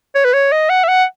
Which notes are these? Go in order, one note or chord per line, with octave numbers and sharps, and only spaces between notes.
C#5
B4
C#5
D#5
F#5
E5
F#5